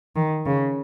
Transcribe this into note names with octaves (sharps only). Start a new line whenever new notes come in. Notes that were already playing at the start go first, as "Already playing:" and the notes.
D#3
C#3